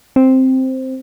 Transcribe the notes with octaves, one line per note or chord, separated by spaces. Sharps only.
C4